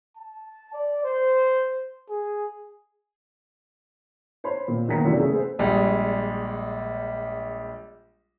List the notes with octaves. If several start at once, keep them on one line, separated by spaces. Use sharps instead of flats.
A5
D5
C5
G#4
C5 C#5 B5 C6
A#2 C4
F#1 D#3 B3 A#5 B6 C#7
F#2 C3 E3 A3 D4 F4
C#3 A3 G#4
C4 G#4 A4 B4 C5
A#1 G3 G#3